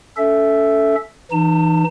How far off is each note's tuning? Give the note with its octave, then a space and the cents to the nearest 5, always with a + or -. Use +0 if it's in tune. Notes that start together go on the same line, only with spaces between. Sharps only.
C#4 +40 A4 +0 E5 +0
E3 +0 D#4 -20 A5 +30